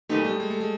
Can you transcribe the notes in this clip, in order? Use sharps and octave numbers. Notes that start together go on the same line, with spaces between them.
A#2 F#3 A3 B3 D#4 G4
G3
G#3
A3
G#3